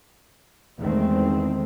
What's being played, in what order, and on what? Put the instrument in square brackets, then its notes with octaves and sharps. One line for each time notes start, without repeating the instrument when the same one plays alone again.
[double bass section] E2 D#3 G#3 A3 C4